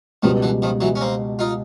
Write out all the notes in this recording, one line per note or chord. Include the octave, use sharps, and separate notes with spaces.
C#2 B2 D#3 F3 G3
D3 E3
D#3 F3
E3 F#3
C#4
A#3 C4
D#4 F4